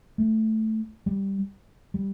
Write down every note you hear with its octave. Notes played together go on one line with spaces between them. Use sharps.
A3
G3
G3